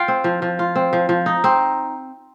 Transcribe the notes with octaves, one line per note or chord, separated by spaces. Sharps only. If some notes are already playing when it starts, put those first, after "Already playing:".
Already playing: F4 F5 G5
C4
F3
F3
F4
C4
F3
F3
D#4
C4